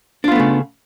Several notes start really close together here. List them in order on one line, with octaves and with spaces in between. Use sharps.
D4 F4 B3 A3 C#3